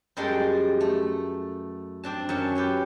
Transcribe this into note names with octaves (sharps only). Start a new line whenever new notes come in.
F#2 G3 G#3 A4 G5 C6
A3
C4 D4 A5
F#2 C#4 A5
G4 B4 C#5